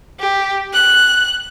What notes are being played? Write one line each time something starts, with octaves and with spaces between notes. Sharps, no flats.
G4
F#6